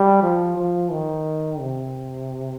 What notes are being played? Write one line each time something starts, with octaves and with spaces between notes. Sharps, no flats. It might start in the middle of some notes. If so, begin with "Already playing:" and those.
Already playing: G3
F3
F3
D#3
C3